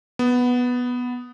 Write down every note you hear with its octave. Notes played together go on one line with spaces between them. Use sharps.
B3